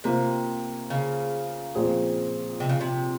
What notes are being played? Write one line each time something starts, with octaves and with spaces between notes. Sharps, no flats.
C3 A#3 F4 C5
C#3
A#2 F3 C4 F4 G#4
C3
C#3
C3